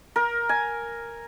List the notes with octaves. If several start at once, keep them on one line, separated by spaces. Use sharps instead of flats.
A#4
G#5